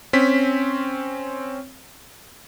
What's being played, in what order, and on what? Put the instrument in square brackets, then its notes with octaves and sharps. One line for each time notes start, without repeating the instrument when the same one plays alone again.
[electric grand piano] C4 C#4 B6